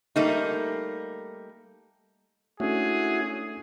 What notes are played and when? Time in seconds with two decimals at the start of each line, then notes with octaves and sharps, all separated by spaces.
0.16 G3 A3 A#3 D#4
2.60 A3 C#4 D4 E4 F#4 G#4 A4